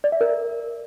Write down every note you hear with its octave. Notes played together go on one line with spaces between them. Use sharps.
D5
E5
A#4